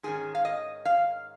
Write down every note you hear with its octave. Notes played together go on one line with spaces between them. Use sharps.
G#2 D#3 C#4 G#4
F5
D#5
F5